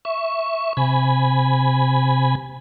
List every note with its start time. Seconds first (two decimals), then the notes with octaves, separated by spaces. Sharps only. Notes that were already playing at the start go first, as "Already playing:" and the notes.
0.05 E5 C#6
0.77 C3 G#5 B5